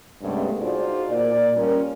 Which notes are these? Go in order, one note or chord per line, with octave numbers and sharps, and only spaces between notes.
G2 C3 G#3 A3 B3 C#4
D#4 F4 F#4 G#4 C5 D5
A#2 D5
G3 C#4 F4 A#4